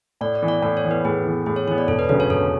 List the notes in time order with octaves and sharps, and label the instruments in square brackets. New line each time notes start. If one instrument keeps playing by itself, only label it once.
[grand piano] A2 [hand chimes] D5
[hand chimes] D5
[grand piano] E3 B3
[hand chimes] D5
[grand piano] A2 [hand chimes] D5
[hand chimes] C#5
[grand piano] E3 B3
[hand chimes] B4
[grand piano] A2 [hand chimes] G#4
[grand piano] E3 B3
[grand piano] A2 [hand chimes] G#4
[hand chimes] C#5
[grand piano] E3 [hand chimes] C#5
[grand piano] B3
[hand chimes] D5
[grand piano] E1 [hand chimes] A4
[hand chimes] B4
[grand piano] D2 C#3 F#3 C#4 [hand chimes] B4
[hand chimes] C#5
[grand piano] E1 [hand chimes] A4